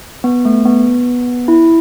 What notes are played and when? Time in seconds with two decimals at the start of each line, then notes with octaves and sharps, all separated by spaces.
0.24 B3
0.45 A3
0.66 B3
1.48 E4